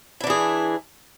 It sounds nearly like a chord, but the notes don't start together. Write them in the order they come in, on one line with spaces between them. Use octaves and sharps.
E4 D4 E3 G#4